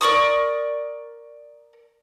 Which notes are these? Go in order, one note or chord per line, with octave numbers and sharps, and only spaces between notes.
A#4 D5 C#6 D#6